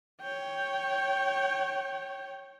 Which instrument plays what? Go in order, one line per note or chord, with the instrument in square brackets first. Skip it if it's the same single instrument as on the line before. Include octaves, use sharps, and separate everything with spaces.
[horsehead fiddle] C#5 G5